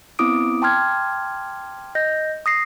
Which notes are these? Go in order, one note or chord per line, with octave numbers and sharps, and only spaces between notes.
B3 C4 E4 D6 D#6 D7
G5 A5 C6 D6 F6 G#6
D#5 G6 A#6
D#6 A#6 C7